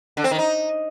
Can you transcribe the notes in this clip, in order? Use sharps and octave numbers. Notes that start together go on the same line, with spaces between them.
D3
C4
D#3
D#4